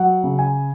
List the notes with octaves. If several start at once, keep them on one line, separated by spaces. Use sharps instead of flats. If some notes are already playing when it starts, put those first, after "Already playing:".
Already playing: F#3 F#5
C#3
G#5